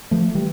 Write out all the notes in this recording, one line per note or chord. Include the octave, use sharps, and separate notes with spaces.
F3 A3
E3 G3